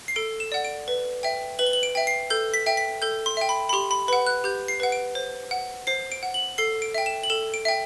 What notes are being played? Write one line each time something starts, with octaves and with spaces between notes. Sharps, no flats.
C7
A4 D7
E7
D5 F#5
D7
B4
E5 G5
B4 F#7
G7
F#7
D7
E5 G5
C7
A4 G6
B6
E5 G5
B6
A4 G6
C6
E5 G5
B5
B5
G4 C6
B5
B4 F#5 B5
F#6
G4 G6
C7
B4 F#5
D7
C5
F#5
C5 C7
D7
F#5
F#7
A4 C7
D7
E5 G5
E7
F#7
A4 E7
D7
E5 G5